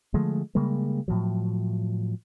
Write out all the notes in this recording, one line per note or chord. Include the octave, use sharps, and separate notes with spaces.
D3 F3 G#3 A3
C#3 G3 G#3 A#3
A2 F3 F#3